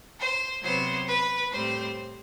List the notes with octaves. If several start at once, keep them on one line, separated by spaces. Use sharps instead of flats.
C5
C3 F#3 B3 C5
B4
A2 G3 C4 C5